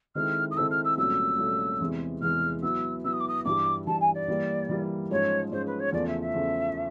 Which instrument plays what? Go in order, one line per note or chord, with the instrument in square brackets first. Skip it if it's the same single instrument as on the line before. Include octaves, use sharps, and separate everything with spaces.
[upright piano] D#3 G#3 C4 E4 A4 [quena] F6
[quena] D#6
[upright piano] D#3 G#3 C4 E4 A4 [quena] E6
[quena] F6
E6
[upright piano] C2 A#2 F#3 A3 C#4 [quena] E6
[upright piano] C2 A#2 F#3 A3 C#4
E2 C3 E3 G#3
[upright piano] E2 C3 E3 G#3 [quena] F6
[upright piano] F#3 B3 E4 [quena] E6
[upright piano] F#3 B3 E4 [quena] E6
[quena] D#6
D6
D#6
[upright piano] G2 E3 G3 [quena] D6
[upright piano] G2 E3 G3 [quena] A5
[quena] G#5
D5
[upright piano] E3 G3 A#3
E3 G3 A#3
[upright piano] G#2 F3 G#3 C#4 [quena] C#5
[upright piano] G#2 F3 G#3 C#4 [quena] C5
[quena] B4
C#5
[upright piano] E2 C#3 F3 A3 [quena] D5
[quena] E5
E5
[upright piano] E2 C#3 F3 A3